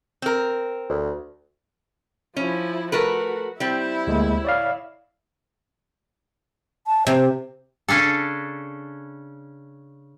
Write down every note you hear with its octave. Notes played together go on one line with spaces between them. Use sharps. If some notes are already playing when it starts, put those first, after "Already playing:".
C4 A#4
D2
F3 C#4 E4
A3 F#4 A#4 B4
G3 C4 E4 E5
D2 G#3 A#3
C#5 D5 F5
A5
C3 C5
C#3 C#4 D4 A4